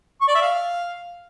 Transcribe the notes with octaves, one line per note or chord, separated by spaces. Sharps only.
C#6
D5
E5
F5